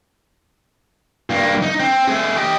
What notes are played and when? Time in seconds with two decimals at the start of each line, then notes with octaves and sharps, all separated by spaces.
1.30 G2 A#3
1.62 D#4
1.80 C4
2.08 A3 G#4
2.36 G4 D#5